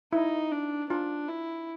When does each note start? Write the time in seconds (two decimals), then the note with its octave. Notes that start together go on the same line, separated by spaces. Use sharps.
0.13 D#4 E4
0.51 D4
0.90 D4 F4
1.28 E4